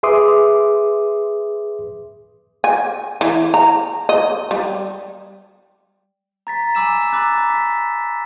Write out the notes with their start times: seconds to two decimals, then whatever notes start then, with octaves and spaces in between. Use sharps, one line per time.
0.03 G#4 B4 E5 C6 D6 D#6
2.64 G#5
3.21 E3
3.54 A#5
4.09 D#5
4.51 G3
6.47 A#5 A6 B6
6.75 G#5 B5 D6 E6 B6 E7
7.12 A#5 B5 D6 F#6 A6
7.50 B6